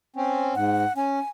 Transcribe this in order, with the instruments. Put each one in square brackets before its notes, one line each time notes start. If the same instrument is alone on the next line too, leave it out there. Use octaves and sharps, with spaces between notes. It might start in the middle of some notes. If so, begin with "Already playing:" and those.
[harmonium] C4 C#4
[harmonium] G#2 [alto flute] F#5
[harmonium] C#4 [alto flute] G#5